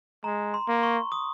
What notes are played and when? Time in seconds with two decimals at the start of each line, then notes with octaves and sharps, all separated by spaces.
0.24 G#3 A#5
0.54 C6
0.68 A#3
0.83 C#6
1.12 D#6